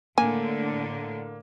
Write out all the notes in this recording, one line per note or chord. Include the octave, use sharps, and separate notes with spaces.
A2 D3 A#3 G#5